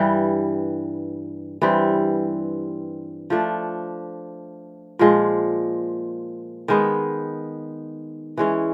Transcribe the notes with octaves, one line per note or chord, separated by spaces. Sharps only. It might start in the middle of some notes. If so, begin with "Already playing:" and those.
Already playing: G2 E3 G3
G2 E3 G3 C4
F3 A3 D4
A#2 F3 G#3
D#3 G#3 B3
E3 G#3 C#4